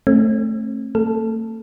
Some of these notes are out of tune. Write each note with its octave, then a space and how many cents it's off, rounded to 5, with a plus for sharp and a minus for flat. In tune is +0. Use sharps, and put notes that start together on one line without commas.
A3 +0 C4 +40
A3 +45 A4 +0